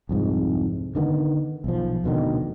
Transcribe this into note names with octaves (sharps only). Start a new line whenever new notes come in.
C2 F2 G#2
D3 D#3 G3 B3
B1 F3
F1 B2 D3 D#3